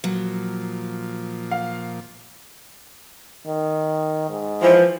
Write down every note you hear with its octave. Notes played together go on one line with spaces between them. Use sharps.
A#2 F3 F#3
F5
D#3
G#2
E3 F3 C5